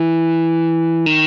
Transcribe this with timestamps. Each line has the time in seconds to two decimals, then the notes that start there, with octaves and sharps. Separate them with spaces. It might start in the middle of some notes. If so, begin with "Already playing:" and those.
Already playing: E3
1.06 D#3